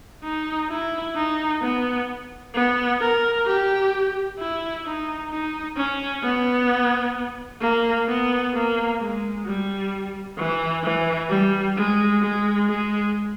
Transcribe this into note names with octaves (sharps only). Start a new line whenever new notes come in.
D#4
E4
D#4
B3
B3
A#4
G4
E4
D#4
D#4
C#4
B3
A#3
B3
A#3
G#3
G3
E3
E3
G3
G#3
G#3
G#3